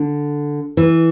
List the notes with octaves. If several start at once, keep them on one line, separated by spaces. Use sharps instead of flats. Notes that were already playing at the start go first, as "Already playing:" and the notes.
Already playing: D3
E3